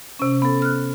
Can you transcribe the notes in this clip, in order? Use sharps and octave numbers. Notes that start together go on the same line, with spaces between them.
C3 C#4
B3 A4
F6 F#6